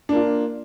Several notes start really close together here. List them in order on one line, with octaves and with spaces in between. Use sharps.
D4 A#3 F4